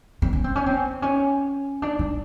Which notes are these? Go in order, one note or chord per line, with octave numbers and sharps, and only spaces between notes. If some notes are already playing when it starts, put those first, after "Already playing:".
C4
C#4
C4
C#4
C4
C#4
D4
D4